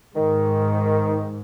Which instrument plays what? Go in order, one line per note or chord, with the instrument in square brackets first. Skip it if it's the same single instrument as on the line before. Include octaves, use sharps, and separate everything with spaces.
[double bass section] G#2 [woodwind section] D#3